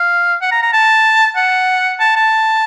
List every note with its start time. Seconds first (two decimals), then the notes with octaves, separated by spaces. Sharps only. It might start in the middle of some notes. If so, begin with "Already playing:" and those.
Already playing: F5
0.42 F#5
0.52 A#5
0.63 A#5
0.73 A5
1.36 F#5
2.00 A5
2.16 A5